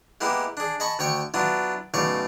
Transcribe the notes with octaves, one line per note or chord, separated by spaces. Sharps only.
G#3 A#3 B3 E4 G4
D4 G#4
D#5 G#5 A5 B5 C#6
D2 C#5 G5 C#6
F#3 B3 D4 E4 F4
B1 A2 C#3 D5 F5 C#6